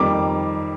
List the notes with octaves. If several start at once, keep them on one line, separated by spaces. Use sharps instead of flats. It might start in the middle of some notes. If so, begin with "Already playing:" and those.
Already playing: F2 D#3 G3 A#3 D6